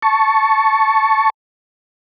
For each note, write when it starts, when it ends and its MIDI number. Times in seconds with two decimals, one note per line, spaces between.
0.02 1.30 81
0.02 1.30 85